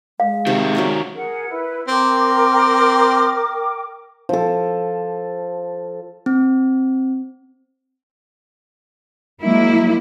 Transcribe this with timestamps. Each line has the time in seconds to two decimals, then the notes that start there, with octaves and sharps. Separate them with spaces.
0.20 G#3 F5
0.47 C3 D#3 F#4
0.75 F#3 C#4 D5
1.14 G#4 A#4 F#5
1.49 E4 B4
1.88 C4 A#4 G5 D6
4.29 F3 A4
6.26 C4
9.43 F#3 G#3 A#3 E4